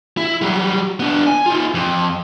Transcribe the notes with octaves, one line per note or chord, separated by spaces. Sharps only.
E4
F#3 G3
B3 D4
G#5
D#4 F4
F2